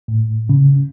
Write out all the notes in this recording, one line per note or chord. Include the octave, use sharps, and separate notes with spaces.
A2
C#3